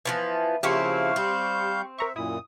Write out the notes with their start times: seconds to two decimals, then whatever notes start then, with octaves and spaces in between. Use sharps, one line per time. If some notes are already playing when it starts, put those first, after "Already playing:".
0.05 E3 F3 B3
0.63 C#3 F3 A#3 C4 E4 G4 F5 C#6
1.16 G3 C4 G6
1.99 A#4 E5 A#5 C#6
2.16 F#2 A#2 E4 D#6